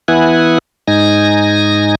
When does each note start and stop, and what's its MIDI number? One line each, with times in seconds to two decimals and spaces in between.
0.08 0.58 52
0.08 0.58 59
0.08 0.58 64
0.08 0.58 78
0.08 0.58 80
0.88 1.95 44
0.88 1.95 63
0.88 1.95 80
0.88 1.95 94